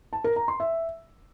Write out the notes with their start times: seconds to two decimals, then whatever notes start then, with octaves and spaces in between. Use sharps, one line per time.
0.13 A5
0.24 A#4
0.36 A#5
0.48 C6
0.60 E5